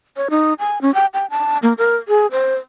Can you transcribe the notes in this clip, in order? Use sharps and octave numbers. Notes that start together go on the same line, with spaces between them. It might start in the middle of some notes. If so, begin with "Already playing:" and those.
C#5
D#4
G#5
C#4
G5
G5
A5
A#3
A#4
G#4
C5